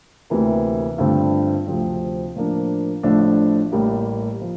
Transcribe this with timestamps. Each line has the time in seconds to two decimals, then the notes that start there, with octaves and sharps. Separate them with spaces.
0.30 D2 C3 E3 A#3
0.98 G2 D3 A3 C4 F4
1.67 D2 C3 F3 A3 C4
2.35 A2 F3 A#3 D4
3.03 A1 A2 F3 A3 D4
3.72 A1 A2 G3 A#3
4.41 F3